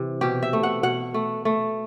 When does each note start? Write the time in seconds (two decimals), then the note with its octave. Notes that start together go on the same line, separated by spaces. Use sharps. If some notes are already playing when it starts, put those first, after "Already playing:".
Already playing: C3 E3
0.21 B2 G4
0.42 E5
0.53 A3
0.63 F#5
0.83 B2 F#5
1.14 A3
1.45 A3